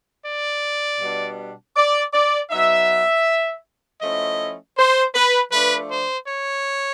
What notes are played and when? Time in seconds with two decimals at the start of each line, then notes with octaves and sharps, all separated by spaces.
0.25 D5
1.01 B2 G3 B3 D4
1.77 D5
2.13 D5
2.51 F#3 B3 D#4 E5
4.02 F3 A3 C#4 E4 D#5
4.77 C5
5.15 B4
5.52 F3 A3 D4 B4
5.90 C5
6.28 C#5